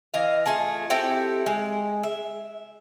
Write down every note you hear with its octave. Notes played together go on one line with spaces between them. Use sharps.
E3 D#5 F5
A3 F4 G#4 A5
C4 E4 G4 A4
G#3
E5